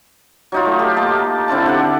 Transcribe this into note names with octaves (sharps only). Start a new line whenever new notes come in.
F#3 D#4 F4
A3
G4
A#3 A5
D3 C4 E4 A5
D3 G4 F#5